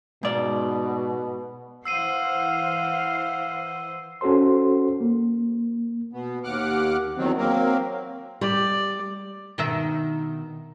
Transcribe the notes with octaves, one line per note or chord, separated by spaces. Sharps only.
G#2 B2 D5
E3 C5 F5 F#5 E6 C7 D#7
C#4 F#4 A4 C5 C6
A#3
B2 B3
D#2 F#5 D6 F6 F#6
E2 D#3 F#3 C4
F#3 A#3 C4 A#4
G3 D5
B2 D#3 E5